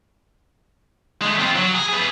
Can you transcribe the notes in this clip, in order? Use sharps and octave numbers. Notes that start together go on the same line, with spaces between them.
G#3 A3
C4 F4
F#3
G#4
G#4 B4